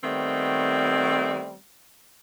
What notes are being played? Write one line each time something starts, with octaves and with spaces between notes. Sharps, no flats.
D#3 G3 A3 B3 C4